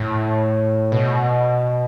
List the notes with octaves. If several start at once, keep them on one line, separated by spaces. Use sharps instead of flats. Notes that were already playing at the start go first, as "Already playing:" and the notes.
Already playing: A2
B2